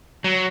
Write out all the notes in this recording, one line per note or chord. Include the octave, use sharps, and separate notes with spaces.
F#3